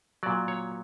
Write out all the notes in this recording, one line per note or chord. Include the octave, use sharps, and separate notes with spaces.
A#2 F#3 D5
C#5